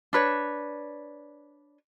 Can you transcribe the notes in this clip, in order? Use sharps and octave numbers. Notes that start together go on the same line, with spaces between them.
D4 B4 C#5